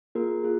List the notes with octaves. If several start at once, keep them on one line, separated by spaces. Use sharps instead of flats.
A#3 F4 G#4 A#4
F4 G#4